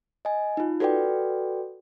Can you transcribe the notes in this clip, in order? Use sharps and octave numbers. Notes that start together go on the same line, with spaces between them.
D#5 G#5
D#4 F4
F#4 A4 B4 D5 G5